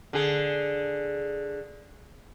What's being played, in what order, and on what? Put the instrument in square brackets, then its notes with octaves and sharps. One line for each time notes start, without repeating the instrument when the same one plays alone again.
[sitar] D3 G#4